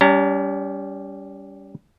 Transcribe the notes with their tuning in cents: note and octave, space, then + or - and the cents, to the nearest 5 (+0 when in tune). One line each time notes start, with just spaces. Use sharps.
G3 +0 C#4 +35 A#5 -25